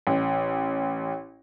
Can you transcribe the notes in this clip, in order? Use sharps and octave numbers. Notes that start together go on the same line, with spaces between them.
A1